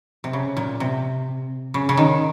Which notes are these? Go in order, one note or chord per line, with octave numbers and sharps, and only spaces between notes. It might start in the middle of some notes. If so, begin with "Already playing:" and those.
C3
C#3
A#2
C3
C#3
C#3
D#3